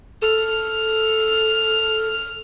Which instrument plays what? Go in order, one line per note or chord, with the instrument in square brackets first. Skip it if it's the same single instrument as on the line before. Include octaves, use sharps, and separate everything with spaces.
[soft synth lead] A4 [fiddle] F6